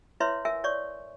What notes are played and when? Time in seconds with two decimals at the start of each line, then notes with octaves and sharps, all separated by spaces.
0.20 E4 B4 C#5 E5 C6
0.45 A#4 E5 G#5
0.64 C#5 D5 C#6